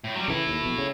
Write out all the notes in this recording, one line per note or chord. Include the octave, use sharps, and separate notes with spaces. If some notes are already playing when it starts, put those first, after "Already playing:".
A2
F#3 G3
C#3 E3 E4 A4
D#2
A#1 B2
C#3